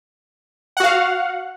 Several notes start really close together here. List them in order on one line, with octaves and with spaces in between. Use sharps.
F#5 F#4 F5